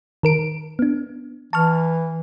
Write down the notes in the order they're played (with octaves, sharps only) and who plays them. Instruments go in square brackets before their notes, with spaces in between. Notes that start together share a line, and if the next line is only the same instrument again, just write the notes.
[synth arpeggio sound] D#3 A#4 D7
B3 D4
[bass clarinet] E3 [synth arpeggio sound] A5 C#6 F6